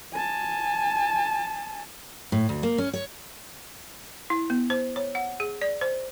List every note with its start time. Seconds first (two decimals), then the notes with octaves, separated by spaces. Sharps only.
0.14 G#5 A5
2.32 A2
2.49 D2
2.63 A#3
2.78 C#4
2.93 C#5
4.30 E4
4.50 B3
4.70 C5
4.96 C#5
5.15 F#5
5.40 G#4
5.62 D5
5.81 C5